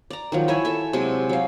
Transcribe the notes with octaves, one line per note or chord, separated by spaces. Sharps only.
D5 A#5
D#3 F3 F#3
E4 C#5 E5 G#5
A4 E5
C3 F#3 G#3
F#3 F5